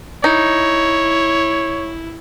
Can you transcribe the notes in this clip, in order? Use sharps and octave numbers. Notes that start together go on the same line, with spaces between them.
D#4 E4 C#5